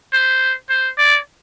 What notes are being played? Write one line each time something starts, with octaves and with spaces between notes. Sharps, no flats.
C5
C5
D5